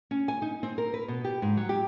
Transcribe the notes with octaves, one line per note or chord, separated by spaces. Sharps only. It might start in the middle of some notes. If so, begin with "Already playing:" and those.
C#4
G#5
D#4
C4
A#4
B4
B2
G4
G#2
F#3
G4